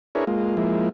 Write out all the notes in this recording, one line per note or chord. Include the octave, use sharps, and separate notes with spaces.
D4 E4 G#4 A#4 B4 C#5
G#3 A#3 F4
F3 G#3 A#3 E4